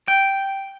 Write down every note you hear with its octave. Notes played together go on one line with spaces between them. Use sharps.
G5